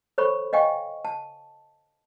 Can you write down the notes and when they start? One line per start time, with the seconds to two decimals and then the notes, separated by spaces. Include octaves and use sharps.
0.18 A4 C5 C#5 B5 C#6
0.53 D#5 F5 G5 G#5 C#6
1.05 A5